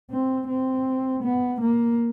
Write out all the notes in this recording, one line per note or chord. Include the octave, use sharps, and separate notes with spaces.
C4
C4
B3
A#3